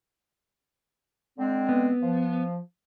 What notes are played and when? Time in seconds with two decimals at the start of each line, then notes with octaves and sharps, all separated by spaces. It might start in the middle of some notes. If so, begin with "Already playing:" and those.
1.39 D3 G#3 C4
1.69 B3
2.03 F3